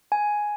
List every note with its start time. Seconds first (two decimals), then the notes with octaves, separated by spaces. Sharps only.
0.12 G#5